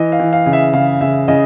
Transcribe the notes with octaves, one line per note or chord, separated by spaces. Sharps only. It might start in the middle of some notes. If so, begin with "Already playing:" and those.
Already playing: E3 D#5
F5
E3
F5
C#3
E5
C#3 F5
C#3 E5
C#3 D#5